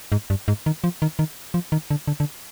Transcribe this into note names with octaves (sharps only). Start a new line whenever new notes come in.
G#2
G2
G#2
D#3
F3
D#3
D#3
F3
D#3
D3
D3
D3